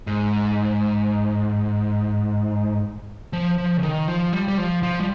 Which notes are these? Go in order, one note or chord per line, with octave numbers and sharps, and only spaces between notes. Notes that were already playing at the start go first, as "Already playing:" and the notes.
G#2
F3
F3
C#3
D#3
F3
G3
G3
F3
F3
G3